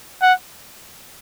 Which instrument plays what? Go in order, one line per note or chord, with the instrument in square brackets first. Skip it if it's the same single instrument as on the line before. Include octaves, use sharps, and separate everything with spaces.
[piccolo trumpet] F#5